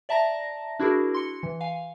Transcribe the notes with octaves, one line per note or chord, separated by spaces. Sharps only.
D5 E5 A5 A#5 A#6
D4 E4 F#4 G#4 A#4
C6 C#7
E3
F5 G#5